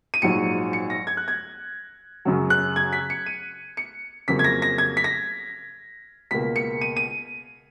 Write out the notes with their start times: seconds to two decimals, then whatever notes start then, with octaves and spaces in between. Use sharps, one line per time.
0.14 D#7
0.22 A#1 G#2 F#3 C#7
0.73 C#7
0.90 A#6
1.07 G#6
1.17 F#6
1.28 G#6
2.25 F#2 C#3 F#3
2.50 F#6
2.76 G#6
2.93 B6
3.10 C#7
3.26 D#7
3.77 C#7
4.28 F2 C#3 F#3 A#3 B6
4.39 G#6
4.44 A#6
4.62 A#6
4.78 G#6
4.97 B6
5.04 A#6
6.31 C#2 B2 A#3 B6
6.56 C#7
6.81 D#7
6.97 D#7